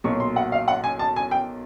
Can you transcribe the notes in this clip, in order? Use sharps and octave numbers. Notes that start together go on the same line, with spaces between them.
B1 A#2 F#3 C#6
C6
F#5
F5
F#5
G#5
A5
G#5
G5